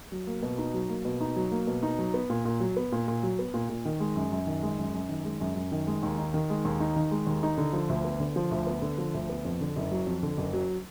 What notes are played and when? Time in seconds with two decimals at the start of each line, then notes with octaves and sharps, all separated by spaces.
0.12 F#3
0.27 A#3
0.43 B2
0.58 D#4
0.74 F#3
0.89 A#3
1.05 B2
1.21 D#4
1.36 F#3
1.52 A#3
1.67 B2
1.83 D#4
1.99 F#3
2.14 B3
2.30 A#2
2.45 A#2
2.60 F#3
2.77 B3
2.92 A#2
3.08 A#2
3.23 F#3
3.39 B3
3.54 A#2
3.70 A#2
3.85 D#3
4.00 G#3
4.16 F#2
4.32 F#2
4.47 D#3
4.63 G#3
4.78 F#2
4.94 F#2
5.09 D#3
5.25 G#3
5.41 F#2
5.56 F#2
5.72 D#3
5.87 G#3
6.03 D#2
6.18 D#4
6.34 D#3
6.50 G#3
6.65 D#2
6.80 D#4
6.96 D#3
7.11 G#3
7.27 D#2
7.43 D#4
7.58 D3
7.73 F3
7.89 D2
8.04 B3
8.20 D3
8.36 F3
8.51 D2
8.67 B3
8.82 D3
8.98 F3
9.14 D2
9.29 B3
9.45 F2
9.61 D3
9.76 F#1
9.91 F#3
10.07 F2
10.23 D3
10.37 F#1
10.53 F#3